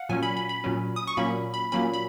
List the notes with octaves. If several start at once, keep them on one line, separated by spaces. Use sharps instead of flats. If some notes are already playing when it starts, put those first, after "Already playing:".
Already playing: F5 F#5
A#2 F#3 C#4 G#5
B5
B5
B5
A#2 F#3 C#4
D#6
C#6
A#2 F#3 A#3 C#4 B5
B5
A#2 F#3 A#3 C#4 B5
B5